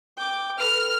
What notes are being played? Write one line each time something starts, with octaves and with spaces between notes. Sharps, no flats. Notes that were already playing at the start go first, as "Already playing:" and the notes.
G5 D6
A4 B4 F6